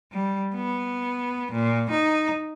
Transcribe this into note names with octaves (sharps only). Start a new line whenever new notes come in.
G3
B3
A#2
D#4